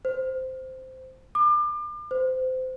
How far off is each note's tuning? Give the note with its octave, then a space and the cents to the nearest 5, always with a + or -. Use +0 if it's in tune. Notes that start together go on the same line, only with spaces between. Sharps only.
C5 -10
D6 +35
C5 -25